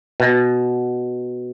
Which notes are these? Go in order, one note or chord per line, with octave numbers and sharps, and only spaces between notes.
B2